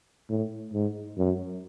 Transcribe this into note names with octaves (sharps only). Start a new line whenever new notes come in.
A2
G#2
F#2